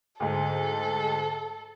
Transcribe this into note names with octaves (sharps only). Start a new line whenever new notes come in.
D2 G#2 A4